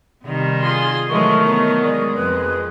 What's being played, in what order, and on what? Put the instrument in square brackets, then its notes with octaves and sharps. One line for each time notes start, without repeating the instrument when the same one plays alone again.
[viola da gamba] C3 D#3 G3
[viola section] F4 G#4 C6
[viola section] D#3 A3 [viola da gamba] E3 F#3 G#3 [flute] C#6
[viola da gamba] F#3 B3
[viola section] G#3 [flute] D5
[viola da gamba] F2 [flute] B4